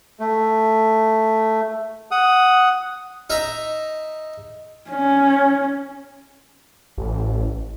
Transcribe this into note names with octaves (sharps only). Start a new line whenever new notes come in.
A3
F#5 D#6
D#4 E5 A#5
C#4
A1